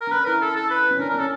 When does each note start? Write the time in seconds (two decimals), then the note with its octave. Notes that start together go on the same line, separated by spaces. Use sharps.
0.01 A#4
0.07 D4
0.12 C#4 B4
0.26 E4 A#4
0.42 A4
0.56 A4
0.70 B4
0.91 C#4
0.99 D4 A#4
1.10 A#4
1.14 C#4 A4